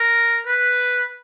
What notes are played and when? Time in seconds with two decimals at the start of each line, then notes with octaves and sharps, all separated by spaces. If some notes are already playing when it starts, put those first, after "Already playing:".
Already playing: A#4
0.46 B4